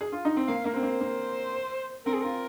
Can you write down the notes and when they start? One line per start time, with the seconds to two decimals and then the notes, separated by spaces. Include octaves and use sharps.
0.01 G#4
0.12 F4
0.25 D#4
0.37 C4
0.48 A#3 F5
0.65 A#3 A#4
0.74 C4 C5
0.83 A#3
1.01 A#3
2.06 C4 A#4
2.14 G#4
2.21 F4 A#4